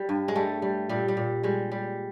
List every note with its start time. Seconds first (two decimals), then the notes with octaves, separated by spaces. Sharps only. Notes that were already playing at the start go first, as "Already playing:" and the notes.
Already playing: G3
0.09 G2
0.28 G#3
0.35 G3 A3
0.62 G3
0.89 A#2 G3
1.08 G3
1.17 A#2
1.43 G3 G#3
1.72 G3